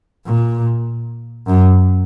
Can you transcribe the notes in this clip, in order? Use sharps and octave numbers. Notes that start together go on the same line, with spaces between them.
A#2
F#2